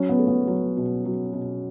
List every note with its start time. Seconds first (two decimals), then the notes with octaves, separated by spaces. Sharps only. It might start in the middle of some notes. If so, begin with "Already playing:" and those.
Already playing: F#3 C#4
0.09 B3
0.19 A3
0.28 B3
0.47 F#3
0.77 B2
1.05 F#3
1.33 B2